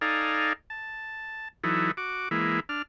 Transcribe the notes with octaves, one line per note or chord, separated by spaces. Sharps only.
D#4 A4 D5 F5 G#5 A#5
A5
E3 F#3 D#4 E4 A4
F#4 D6
E3 G#3 A#3 E4
D4 F6